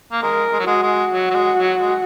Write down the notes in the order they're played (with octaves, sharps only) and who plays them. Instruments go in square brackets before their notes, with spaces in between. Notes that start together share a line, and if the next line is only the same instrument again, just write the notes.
[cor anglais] A#3
[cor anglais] G#3 [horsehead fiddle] A#4
[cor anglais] G#3
F#3
[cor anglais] G#3 [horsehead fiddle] F#4
[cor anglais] G#3
F#3
F#3
G#3
F#3
G#3